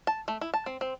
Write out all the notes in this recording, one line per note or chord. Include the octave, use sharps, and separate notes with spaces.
A5
A3
E4
A5
C4
C4